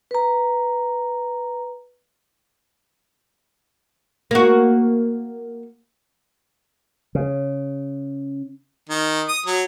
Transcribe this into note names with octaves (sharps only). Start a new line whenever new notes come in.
B4 A#5
A#3 F#4
C#3
D#3
D#6
F#3